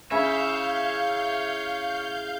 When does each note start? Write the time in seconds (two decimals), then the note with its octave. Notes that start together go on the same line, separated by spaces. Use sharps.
0.12 C#3 E4 C#5 E5 F5 G6